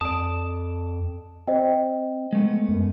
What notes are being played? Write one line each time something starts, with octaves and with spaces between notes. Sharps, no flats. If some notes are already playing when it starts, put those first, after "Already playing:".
F2 D5 A5 D#6
C4 C5 D#5 G5
G#3 A3 B3
F#2